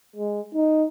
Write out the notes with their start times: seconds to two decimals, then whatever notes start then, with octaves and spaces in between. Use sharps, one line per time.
0.16 G#3
0.54 D#4